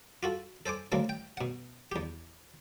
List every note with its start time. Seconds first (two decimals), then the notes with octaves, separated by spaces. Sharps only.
0.23 F4 F#4 A4
0.66 A4 C5 G#5 D6
0.92 D2 F#3 G#3 A#3 C4
1.09 G5
1.37 B2 F#5
1.92 E2 G4